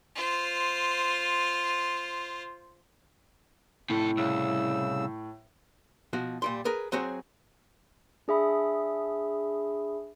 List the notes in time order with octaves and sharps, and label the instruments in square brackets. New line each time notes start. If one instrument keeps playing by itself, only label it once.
[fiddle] F4 C5
[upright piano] A2 [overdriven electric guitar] C3 A4
[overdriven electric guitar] C2 [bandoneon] C#3 E6
[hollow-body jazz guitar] B2 F3 F#4
A#2 G3 C6
G#4 A#4 B4
F#3 C4 F#4 G#4 C5 C#5
[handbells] D4 G#4 E5 B5 D#6